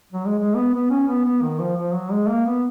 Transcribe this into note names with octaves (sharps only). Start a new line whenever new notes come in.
F#3
G#3
G#3
B3
B3
C#4
B3
B3
D#3
F3
F3
F#3
G#3
A#3
B3